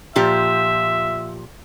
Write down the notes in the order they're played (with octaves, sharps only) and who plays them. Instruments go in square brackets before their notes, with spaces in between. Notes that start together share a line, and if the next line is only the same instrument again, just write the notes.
[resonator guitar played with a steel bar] A#2 F3 G4 [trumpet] E5